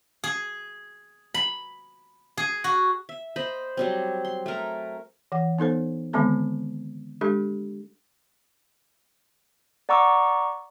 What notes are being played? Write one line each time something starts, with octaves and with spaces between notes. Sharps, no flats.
G#4
B5
G#4
F#4
E5
C5 D#5 B5
F#3 G3 C4
C6
A3 A#4
E3 F#5
B3 D#4 A4 C5
D3 D#3 G#3 B3 C4 A4
G#3 D4 G4 A4
D5 F#5 A#5 C#6 D6 E6